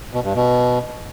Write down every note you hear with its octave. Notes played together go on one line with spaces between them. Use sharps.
B2
G2
B2